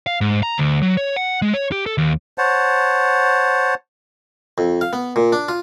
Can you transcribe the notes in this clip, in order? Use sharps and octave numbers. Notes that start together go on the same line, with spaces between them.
F5
G#2
A#5
D2
F#3
C#5
F#5
G#3
C#5
G4
A4
D#2
C5 C#5 F#5 A5
F2
F5
B3
A#2
D4
F4